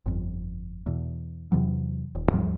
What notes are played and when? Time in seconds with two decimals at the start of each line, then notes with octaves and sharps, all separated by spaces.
0.06 G1 F2
0.86 E2 B2
1.52 E2 C3 E3 F#3
2.15 D#1
2.31 D#2 G#2 F3 G3